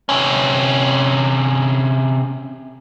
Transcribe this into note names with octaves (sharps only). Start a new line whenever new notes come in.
C3 C#4